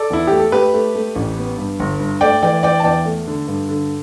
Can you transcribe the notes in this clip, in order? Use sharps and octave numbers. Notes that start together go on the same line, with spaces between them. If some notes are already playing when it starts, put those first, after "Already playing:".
Already playing: A4 D5
E2 E4
A3 G4
A4
A3 G4 B4
A3
A3
A1
B3
G2
G1
G2
A3 D5 G5
E3 D5 G5
E3 D5 G5
A5
E2 D5 G5
A3
D3
G2
D3